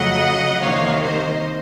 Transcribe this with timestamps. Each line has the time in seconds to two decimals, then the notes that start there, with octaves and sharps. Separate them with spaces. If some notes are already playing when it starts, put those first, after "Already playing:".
Already playing: F2 C#3 F#3 A3 D#5 F#5
0.62 C2 C3 D#3 A#3 C#5 F5
1.02 C5 D#5